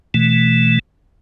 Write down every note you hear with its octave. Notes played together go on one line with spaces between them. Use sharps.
B2 E3 A3